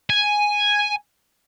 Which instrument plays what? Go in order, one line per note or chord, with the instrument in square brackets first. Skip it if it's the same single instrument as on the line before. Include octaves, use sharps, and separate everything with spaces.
[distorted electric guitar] G#5